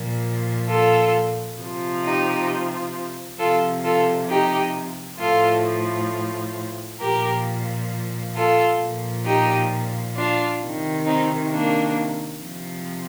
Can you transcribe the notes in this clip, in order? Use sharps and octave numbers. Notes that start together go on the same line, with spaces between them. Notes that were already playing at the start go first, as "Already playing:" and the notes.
Already playing: A#2 F3
F4 A4
C3 F3
D#4 G4
C3 F3 F4 A4
F4 A4
D#4 G4
A2 F3 F4 A4
A#2 F3 G4 A#4
F4 A4
A#2 F3
D#4 G4
D4 F4
C3 D#3
C4 D#4
A#3 D4
C3 F3